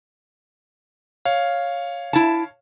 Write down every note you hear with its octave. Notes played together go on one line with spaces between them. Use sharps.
C#5 F5
E4 A5